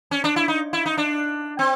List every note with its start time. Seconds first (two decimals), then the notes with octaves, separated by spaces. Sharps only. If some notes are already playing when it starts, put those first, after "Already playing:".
0.11 C#4
0.24 D4
0.36 E4
0.48 D#4
0.73 E4
0.86 D#4
0.97 D4
1.59 C4